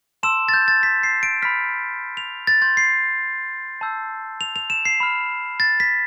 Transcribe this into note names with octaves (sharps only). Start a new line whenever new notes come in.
A5 C6 E6 E7
A6
G6
A6
B6
C7
D7
B5 F6 B6
F7
A6
C6 G6 A6
C7
A5 E6 G6
F7
F7
E7
C7
B5 F6
A6
B6